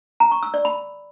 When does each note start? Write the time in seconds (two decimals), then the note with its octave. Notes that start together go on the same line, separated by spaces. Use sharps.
0.20 A#5
0.31 C#6
0.43 E6
0.54 D5
0.65 B5